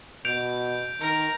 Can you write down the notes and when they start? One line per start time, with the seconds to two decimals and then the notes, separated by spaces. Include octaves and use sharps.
0.25 B2 G6 D7 F7
1.00 D#3 A#4